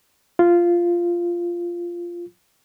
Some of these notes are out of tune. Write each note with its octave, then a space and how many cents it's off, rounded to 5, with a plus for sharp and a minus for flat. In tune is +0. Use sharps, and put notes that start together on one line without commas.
F4 -10